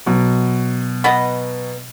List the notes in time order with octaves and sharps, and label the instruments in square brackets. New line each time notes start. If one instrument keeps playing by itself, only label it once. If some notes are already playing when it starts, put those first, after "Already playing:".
[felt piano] B2 F#3
[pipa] B3 B4 D#5